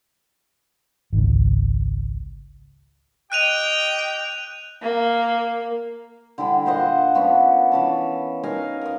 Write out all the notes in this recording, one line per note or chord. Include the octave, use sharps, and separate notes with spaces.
G#1 C#2
G4 D#5 G5 F#6 D#7 F7
A#3
D3 G3 E4 B5
A#2 C5 D#5 F#5
F3 B3 C#4 D4
E3 C#4 A5
D#4 A#4 F5 G#5
A#4 D#5